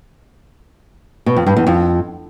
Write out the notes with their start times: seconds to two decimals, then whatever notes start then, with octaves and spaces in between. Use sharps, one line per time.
1.26 B2
1.36 F2
1.47 G2
1.57 E2
1.67 F2